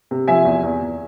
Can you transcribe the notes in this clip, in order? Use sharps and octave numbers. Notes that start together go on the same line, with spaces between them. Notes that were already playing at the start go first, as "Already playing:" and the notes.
C3
F3 E5 G#5
E2
E2
E2